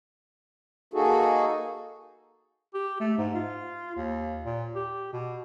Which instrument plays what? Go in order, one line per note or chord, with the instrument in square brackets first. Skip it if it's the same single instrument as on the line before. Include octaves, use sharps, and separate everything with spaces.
[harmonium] A#3 D#4 F#4 G#4 A4
[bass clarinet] G4
A3
G#2
F4
D#2
A#2
G4
B2